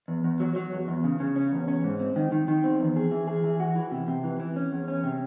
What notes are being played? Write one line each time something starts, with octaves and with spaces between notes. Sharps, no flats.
E2
E2
F#3
F#3
E2
E2
C#3
C#3
C#4
E2
C#4
G#2
C4
D#3
D#3
D#3
C4
E2
G#4
E3
G#4
E3
F#4
E3
C3
C3
E3
E3
C#4
E2
C#4
C3